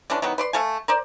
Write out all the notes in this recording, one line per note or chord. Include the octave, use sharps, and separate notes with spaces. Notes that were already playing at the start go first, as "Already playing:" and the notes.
D3 E3 C#4 D4
D#3 E3 F#3 B3
B4 D5 C6
A3 A4 F5 G#5
A#4 C5 D5